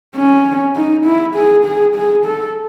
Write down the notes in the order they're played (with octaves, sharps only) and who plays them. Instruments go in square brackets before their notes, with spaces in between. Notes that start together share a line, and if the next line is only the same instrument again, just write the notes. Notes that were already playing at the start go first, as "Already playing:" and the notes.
[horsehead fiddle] C#4
D#4
E4
G#4
G#4
G#4
A4